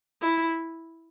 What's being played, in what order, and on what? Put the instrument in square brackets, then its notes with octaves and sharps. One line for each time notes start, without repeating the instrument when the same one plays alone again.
[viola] E4